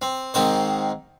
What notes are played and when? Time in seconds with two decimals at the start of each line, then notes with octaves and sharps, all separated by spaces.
0.02 C4
0.34 G#2 D#3 C4 C5